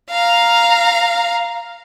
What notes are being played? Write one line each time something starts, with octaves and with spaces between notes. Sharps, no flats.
F5 A#5